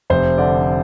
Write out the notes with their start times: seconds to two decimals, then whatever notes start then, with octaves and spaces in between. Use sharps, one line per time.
0.10 F1 C5
0.38 D3 D5